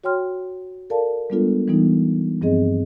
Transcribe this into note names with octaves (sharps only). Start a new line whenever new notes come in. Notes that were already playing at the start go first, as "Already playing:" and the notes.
F#4 C#5 G5 C6 F6
A4 A#4 D5 F5 A5
G3 G#3 B3 D4 F4 A4
E3 G3 B3 D#4
G2 F3 C4 G#4 D#5